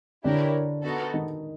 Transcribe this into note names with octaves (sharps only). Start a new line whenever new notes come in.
D3 D4 E4 G4 A#4 C#5
B3 D#4 F#4 A4
D#3 D#4